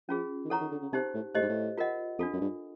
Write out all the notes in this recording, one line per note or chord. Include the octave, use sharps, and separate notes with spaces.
F3 C#4 F4 G#4
D#3
E3 A4 C#5 F#5 A#5 C#6
D#3
D3
C#3
C3 D#4 G4 C5
A2
A2 G4 C5 D#5
G#2
A2
F4 A#4 D#5 F#5
F2 D4 F4 A4
F#2
G2